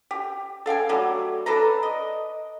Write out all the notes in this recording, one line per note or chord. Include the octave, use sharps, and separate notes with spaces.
G4
A4 F5 G5 G#5
F#3 G3 A3
D4 A4 B4 A#5
D#5